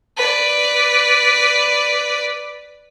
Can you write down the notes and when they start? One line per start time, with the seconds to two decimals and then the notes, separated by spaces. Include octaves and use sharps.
0.17 B4 D5